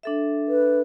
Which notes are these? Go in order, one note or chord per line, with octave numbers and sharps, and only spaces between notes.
D4 A4 E5
B4